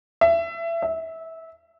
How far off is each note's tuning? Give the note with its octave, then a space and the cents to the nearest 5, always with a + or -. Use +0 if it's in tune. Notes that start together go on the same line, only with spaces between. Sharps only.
E5 +25
E5 -20